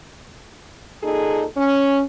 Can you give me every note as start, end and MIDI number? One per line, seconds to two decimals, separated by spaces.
1.03 1.44 46
1.03 1.44 63
1.03 1.44 68
1.03 1.44 69
1.57 2.02 61